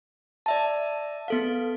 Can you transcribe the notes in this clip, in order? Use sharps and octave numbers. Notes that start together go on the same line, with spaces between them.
D5 E5 A5
B3 A4 F5